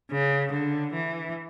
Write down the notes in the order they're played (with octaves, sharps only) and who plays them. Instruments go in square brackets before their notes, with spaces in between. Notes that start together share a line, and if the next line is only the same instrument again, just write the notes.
[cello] C#3
D3
E3